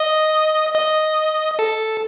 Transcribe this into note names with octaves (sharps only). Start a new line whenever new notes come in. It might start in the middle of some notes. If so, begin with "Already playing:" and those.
Already playing: D#5
D#5
A4